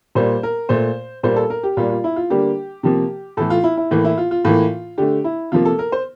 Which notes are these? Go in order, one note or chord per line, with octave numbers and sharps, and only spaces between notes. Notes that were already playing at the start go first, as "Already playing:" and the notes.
A#2 G3 A#3 C5
A#4
A#2 A3 C5
A#2 G3 A#3 C5
A4
A#4
G4
A#2 G3 A#3 F4
F4
E4
F4
D3 G3 A#3 G4
C3 F3 A#3 G4
A2 E3 A3 A4
F4
E4
E4
A2 E3 A#3
E4
F4
F4
A2 E3 A#3 F4
D3 A3 G4
E4
C3 F3 A#3 F4
A4
A#4
C5